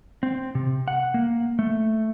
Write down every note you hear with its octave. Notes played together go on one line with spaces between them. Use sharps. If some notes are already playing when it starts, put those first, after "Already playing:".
C4
C3
F#5
A#3
A3